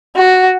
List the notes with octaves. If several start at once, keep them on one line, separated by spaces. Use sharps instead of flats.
F#4